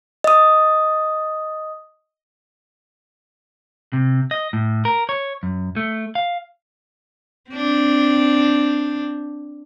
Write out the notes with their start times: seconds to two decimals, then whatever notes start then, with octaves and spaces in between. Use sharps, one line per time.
0.24 D#5 D#6
3.93 C3
4.31 D#5
4.53 A2
4.85 A#4
5.09 C#5
5.43 F#2
5.76 A3
6.15 F5
7.51 C4 D4